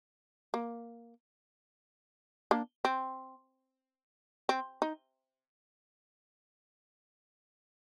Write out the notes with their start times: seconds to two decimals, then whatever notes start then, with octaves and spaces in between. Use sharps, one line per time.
0.54 A#3
2.51 A#3 D4
2.85 C4
4.49 C4
4.82 D#4